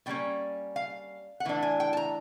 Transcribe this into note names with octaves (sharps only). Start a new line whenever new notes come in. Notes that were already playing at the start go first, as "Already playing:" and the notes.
B2 G3 A#3 C#4 G5
F5
F#5
A2 E3 D4
G#5
G5
A5
A#5